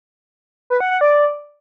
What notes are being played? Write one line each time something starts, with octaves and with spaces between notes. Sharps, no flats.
B4
F#5
F#5
D5